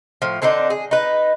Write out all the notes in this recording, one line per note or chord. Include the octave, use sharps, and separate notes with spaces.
A2 F3
D3 C4 D4 D#4
G#4
D#4 B4